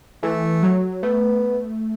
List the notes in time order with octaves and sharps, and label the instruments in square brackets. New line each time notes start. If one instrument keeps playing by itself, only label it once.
[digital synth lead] E3 [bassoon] A3
[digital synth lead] F#3
[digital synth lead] A3 [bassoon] B3